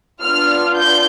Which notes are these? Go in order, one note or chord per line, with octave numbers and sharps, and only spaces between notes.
B3 D4 F4 F6
G6